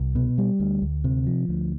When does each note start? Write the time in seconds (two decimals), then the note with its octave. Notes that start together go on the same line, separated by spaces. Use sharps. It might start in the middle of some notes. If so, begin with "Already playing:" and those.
Already playing: C2
0.15 B2
0.38 G3
0.60 D2
0.82 D2
1.04 C3
1.27 F3
1.49 D2